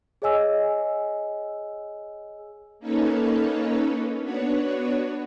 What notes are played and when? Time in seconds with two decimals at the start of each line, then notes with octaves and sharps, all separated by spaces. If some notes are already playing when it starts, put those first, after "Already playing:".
0.22 G#4 C#5 D#5 G#5 E6
2.79 A#3 C#4 D#4 A4 B4 C#5
4.21 B3 D4 F#4 B4 C#5